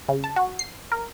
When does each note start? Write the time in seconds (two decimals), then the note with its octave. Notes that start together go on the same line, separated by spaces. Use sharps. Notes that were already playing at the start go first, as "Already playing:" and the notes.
0.09 C#3
0.24 A5
0.36 F#4
0.59 C7
0.92 A#4